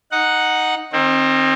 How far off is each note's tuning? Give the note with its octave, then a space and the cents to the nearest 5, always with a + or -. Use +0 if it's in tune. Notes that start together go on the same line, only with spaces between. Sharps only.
D#4 +0 F#5 +0
D#3 -10 C4 +25